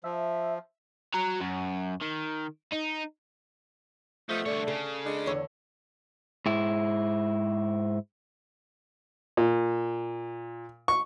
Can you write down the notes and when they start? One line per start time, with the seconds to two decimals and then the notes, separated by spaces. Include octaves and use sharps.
0.04 F3 E5
1.14 F#4 A#5
1.40 F#2
2.01 D#3
2.72 D#4
4.29 F3 A3 B3 D#4
4.46 C2 D3 D4 C#5
4.68 C#3 A4
5.06 G#3 D4
5.26 E2 D3 C#5
6.46 G#2 E4
9.37 A#2
10.88 C#6